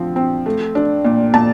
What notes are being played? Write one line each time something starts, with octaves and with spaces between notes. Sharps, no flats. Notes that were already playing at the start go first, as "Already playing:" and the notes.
Already playing: D3 F3 C4
C4
A3
D4
A#2
A#2 A5